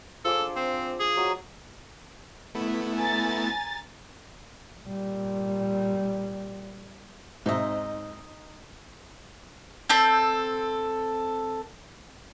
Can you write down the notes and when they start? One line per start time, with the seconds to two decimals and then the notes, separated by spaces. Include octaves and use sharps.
0.25 F3 G#4 A4 D5
0.39 D4
0.56 C4
1.00 G#4
1.17 F#3 D#5 E6
2.55 A3 B3 E4
2.96 G#5 A#5 A6
4.85 A#2 G3
7.46 G#2 C4 D#4 D#5 E5
9.89 C4 A4 G6